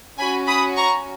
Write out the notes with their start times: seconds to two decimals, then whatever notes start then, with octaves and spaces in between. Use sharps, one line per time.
0.19 C#4 F#4 G#5 B5
0.47 B5 D#6
0.76 A#5 C#6